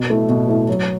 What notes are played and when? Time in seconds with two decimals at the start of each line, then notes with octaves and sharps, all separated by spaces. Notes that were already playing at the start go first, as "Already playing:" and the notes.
Already playing: B2
0.10 A3 E4
0.29 B2
0.48 A3 E4
0.68 F#3